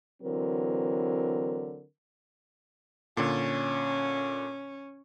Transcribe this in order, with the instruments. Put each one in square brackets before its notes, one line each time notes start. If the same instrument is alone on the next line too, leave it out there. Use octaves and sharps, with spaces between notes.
[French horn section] D3 E3 F#3 C4 A#4
[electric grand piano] A#2 D3 [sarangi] C#4